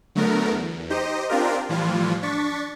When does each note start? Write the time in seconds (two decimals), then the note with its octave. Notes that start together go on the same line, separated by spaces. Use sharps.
0.15 D3 F#3 A3 B3 A#4
0.51 E2
0.90 D#4 G4 C5 D#5
1.29 C4 D4 F4 G4 A#4
1.69 A2 E3 F3 G3 F4
2.23 D4 C#6 A6 B6